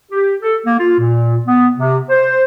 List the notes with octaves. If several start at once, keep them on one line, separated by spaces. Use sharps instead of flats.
G4
A4
A#3
F4
A#2
B3
C3
C5